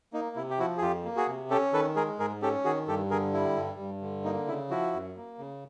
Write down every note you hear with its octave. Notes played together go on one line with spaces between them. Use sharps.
A#3 D#4
C3 E4
G4
F3 E4 F#4
G#4
F2 F4 G4
A#3
F#4 G#4
C3
C#4 G4 A4
D#3 A4 B4
G#3 G#4 A#4
G#2 G#4 A#4
C#4 G4 A4
D#3 F#4 G#4
G2 G4 A4
D3 G#4 A#4
G3 E4
G2
G2
D3
A#3 D#4
C#3 E4
F3 E4 F#4
F#2
A#3
C#3